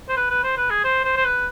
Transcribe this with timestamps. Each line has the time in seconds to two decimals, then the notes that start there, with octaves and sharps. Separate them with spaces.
0.09 C5
0.17 B4
0.30 B4
0.44 C5
0.57 B4
0.70 G#4
0.84 C5
1.04 C5
1.17 C5
1.25 B4